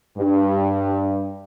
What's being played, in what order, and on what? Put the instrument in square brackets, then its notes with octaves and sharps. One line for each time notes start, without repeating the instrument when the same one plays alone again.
[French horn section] G2